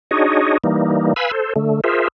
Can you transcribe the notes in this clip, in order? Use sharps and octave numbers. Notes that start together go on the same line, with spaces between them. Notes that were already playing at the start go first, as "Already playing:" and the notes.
D4 D#4 F#4 G#4 C#5 D#5
E3 G3 A#3 D#4
B4 F5 G#5 B5 E6
A4 C5
D3 A3
F4 G#4 A#4 C5 E5